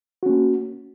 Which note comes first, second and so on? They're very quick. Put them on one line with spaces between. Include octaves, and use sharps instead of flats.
F#4 C#4 A#3